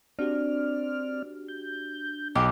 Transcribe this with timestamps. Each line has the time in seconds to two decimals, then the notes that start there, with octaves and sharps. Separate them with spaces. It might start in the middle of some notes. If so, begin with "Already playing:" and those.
0.19 C4 D4 F#4 G4 D5 F6
1.48 G6
2.35 B1 G4 D#5